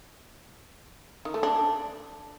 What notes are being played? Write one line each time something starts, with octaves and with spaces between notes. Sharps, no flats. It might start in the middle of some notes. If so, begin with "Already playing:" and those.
D#3
A3
D4